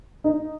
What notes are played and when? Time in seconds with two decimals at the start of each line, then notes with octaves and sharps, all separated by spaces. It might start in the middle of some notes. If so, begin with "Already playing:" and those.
0.24 D#4